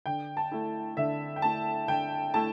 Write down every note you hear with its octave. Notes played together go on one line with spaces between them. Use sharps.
D3 G5
A5
A3 E4
D3 E5
G5
A3 E4 A5
D3 G5
A3 E4 A5